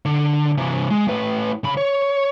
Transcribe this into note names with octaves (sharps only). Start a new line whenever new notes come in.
D3
C3 E3
G#3
A2 B4
C#3 B5
C#5